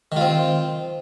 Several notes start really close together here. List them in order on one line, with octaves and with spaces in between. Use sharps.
D#3 F4 C4